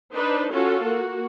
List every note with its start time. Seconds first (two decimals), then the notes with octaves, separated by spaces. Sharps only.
0.13 D4 D#4 B4 C5
0.52 C#4 F4 F#4 A4
0.84 A#3 F#4